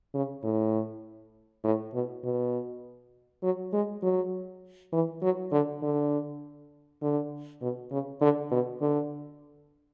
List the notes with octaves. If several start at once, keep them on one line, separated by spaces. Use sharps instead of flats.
C#3
A2
A2
B2
B2
F#3
G#3
F#3
E3
F#3
D3
D3
D3
B2
C#3
D3
B2
D3